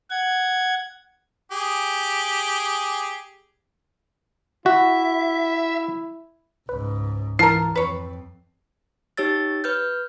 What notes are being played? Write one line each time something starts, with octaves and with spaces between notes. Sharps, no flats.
F#5 G#6
G4 G#4
E4 F#4 E5
C#2 G#2 B4
G#2 E3 F4 A#4 A5 F6 C7
F2 B4 C#5
D#4 G4 C#5 E6 A6
B4 F6 G6